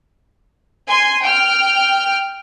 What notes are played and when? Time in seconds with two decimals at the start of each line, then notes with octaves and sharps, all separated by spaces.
0.88 G#5 C6
1.22 G5 F6